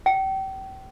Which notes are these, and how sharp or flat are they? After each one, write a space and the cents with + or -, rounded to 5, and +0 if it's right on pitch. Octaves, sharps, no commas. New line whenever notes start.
G5 -35